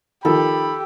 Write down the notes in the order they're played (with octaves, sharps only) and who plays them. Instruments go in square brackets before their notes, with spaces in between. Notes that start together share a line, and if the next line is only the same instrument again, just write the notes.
[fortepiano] D#3 F3 [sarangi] G4 [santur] A4 [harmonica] B5